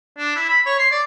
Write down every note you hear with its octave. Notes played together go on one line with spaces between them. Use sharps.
D4
E4
B5
C#5
C6
D5